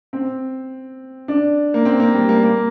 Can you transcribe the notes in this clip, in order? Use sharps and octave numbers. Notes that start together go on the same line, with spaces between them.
C4
D4
A#3
C4
A#3
G3
A#3
A#3